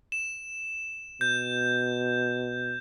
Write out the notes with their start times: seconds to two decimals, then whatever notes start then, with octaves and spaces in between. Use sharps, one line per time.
0.12 E7
1.21 B2 G6